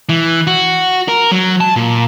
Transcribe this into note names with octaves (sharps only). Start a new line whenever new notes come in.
E3
F#4
A#4
F#3
A5
A#2